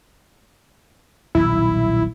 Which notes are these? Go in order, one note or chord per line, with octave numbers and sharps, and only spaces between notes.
D#1 B1 E4